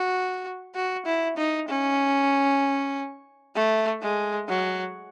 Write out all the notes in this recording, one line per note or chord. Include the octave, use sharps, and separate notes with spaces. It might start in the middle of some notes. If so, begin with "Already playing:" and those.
Already playing: F#4
F#4
E4
D#4
C#4
A3
G#3
F#3